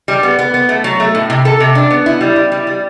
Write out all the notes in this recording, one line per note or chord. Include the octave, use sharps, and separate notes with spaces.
G3
B3
B3
B3
A3
F#3
A3
A2
C3
A4
C3
D4
B3
E4
G3
E4
G3
G3